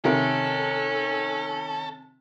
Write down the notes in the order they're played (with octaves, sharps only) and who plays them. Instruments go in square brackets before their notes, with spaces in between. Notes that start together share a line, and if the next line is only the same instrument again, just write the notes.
[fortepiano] C3 [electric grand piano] D#3 A#4 [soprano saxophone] C#4 [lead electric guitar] A4